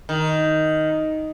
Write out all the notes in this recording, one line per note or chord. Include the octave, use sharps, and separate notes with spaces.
D#3